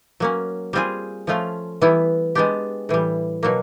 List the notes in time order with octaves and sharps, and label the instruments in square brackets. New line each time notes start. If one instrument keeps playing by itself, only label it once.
[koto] F#3 A#3 C#4
G3 C4 F4 G#4
F3 A3 C#4 F4
E3 G3 B3 E4
G#3 B3 D4 G4
A2 E3 G3
B2 F#3 A#3